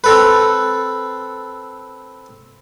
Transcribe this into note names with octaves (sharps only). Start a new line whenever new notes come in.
C4 A4 B4